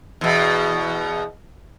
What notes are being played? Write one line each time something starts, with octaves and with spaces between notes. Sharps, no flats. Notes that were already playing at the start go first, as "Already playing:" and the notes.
E2 B2